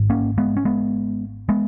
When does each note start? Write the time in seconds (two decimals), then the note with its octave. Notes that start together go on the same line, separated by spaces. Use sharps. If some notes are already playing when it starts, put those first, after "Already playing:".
Already playing: G#1 G#2
0.10 A#3 C#4
0.38 G#3 B3
0.57 C#4
0.65 G#3 B3
1.49 G#3 B3